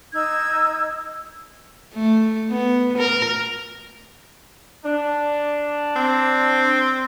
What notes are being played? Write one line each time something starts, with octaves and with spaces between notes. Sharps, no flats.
D#4 E6 G#6
A3
B3
A#4
D4
C4